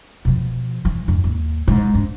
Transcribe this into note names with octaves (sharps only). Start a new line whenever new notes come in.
B2 F3
E3 F3
F2 G#2
D#2
B1 G#2
D4